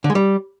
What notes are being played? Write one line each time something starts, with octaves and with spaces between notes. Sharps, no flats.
D3
G#3
G3